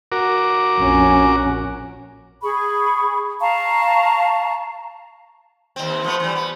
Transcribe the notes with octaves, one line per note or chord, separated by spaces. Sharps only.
F#4 A#4 D6
A#1 F2 C#4
G#4 B5 C#6
F5 A5 A#5 C#6
D#2 C4
F3 A3 B3
E3 G3
B3